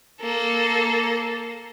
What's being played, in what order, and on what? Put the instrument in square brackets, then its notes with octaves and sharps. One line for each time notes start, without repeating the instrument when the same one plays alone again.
[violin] A#3 A4